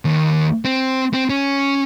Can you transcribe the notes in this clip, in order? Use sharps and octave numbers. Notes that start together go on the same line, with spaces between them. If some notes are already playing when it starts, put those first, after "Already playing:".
D#2
C4
C4
C#4